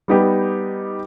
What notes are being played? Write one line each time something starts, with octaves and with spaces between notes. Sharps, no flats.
G3 B3 D#4 G4